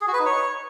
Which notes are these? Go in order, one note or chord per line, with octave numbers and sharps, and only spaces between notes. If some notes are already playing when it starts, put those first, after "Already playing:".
G#4
F#4
B4
D#4
C#5